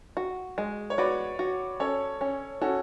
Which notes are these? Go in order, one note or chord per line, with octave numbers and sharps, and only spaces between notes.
F#4
G#3
C#5
F#4 B4 D5
F#4
C#4 A4 C#5
C#4
C#4 F#4 A4